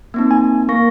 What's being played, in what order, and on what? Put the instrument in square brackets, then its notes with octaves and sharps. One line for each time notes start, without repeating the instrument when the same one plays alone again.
[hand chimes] A#3 C4 D#4
[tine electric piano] G#5
[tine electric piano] A#3 [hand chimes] C#6 A#6